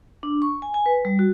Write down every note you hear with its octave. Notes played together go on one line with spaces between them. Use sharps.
D4
C#6
G#5
G#5
B4
G3
F#4